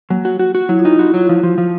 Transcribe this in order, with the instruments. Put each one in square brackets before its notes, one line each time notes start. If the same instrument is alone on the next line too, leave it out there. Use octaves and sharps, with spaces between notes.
[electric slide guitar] F#3 [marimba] A#3
[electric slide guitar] F#4
F#4
F#4
[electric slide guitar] F#3 [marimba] E4
[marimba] F4
[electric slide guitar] D#4 [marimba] E4
[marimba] F4 [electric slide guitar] F#4
[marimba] E4
[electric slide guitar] F#3 [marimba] F4
[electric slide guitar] F3 [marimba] E4
[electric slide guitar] F3
[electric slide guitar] F3 [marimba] F4